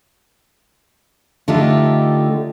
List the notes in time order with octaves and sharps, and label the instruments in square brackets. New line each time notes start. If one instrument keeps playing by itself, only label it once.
[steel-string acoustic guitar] D3 A3 D4 D#4 F4 G4